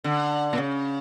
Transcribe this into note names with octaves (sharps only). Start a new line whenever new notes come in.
D3
A#2
C#3